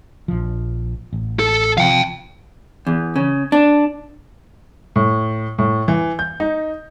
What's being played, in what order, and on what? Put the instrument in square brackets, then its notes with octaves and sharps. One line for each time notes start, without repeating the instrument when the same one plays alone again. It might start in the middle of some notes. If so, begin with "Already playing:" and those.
[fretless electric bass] A#1 F3
A1
[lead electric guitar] A4
[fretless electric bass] C3 F3 [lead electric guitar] F5 G5
[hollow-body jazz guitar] E2
C#3
D4
[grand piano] A2
A2
E3
G6
D#4